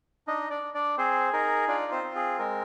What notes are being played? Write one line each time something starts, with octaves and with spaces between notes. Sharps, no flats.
D4 D#4 D#5
D4 D5
D4
D4 D5
C4 G#4 C5
D#4 A#4
D4 F4 D5
C4 C5
C4
G#4
G#3 A#4